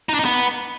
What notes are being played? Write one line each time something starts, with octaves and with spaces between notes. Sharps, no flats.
D#4
D4
D#4
B3